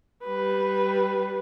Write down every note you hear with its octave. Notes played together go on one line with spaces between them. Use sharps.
G3 B4